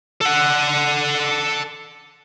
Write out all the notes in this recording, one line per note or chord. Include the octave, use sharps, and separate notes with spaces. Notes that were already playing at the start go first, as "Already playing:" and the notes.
A4 F#5